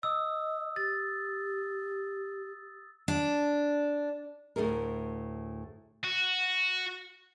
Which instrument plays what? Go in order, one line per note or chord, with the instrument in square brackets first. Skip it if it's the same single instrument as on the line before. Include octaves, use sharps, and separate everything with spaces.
[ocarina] D#5 [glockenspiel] D#6 E6
[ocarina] G4 [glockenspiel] A6
[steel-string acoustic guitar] D4
[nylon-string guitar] D2 A2 C3 G#4 A#4
[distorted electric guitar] F#4